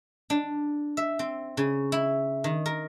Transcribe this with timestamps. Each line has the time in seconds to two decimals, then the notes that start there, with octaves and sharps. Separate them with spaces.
0.30 D4
0.97 E5
1.19 C4
1.57 C#3
1.92 E4
2.44 D#3
2.66 A#4